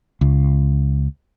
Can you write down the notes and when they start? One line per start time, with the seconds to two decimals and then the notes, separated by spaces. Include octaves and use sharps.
0.21 C#2